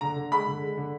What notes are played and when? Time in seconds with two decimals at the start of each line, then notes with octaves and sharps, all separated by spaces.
0.01 D3 A#5
0.16 D3
0.32 G#3 B5
0.47 D3
0.61 G#3
0.77 D3